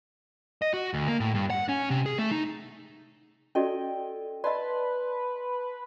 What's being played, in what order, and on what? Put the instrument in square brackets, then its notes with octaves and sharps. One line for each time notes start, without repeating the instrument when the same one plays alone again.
[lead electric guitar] D#5
F#4
D2
A#3
A2
G2
F#5
C#4
C3
G#4
A3
D#4
[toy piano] C#4 F#4 D5 [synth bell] A4 D#5 G5
[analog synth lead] B4 [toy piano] D5 D#5 [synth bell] A5 C6